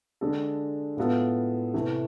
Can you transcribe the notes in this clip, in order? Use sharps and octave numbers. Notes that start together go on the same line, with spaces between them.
D3 G#3 D4 A4
A2 G#3 B3 F4 A4
C3 E3 A3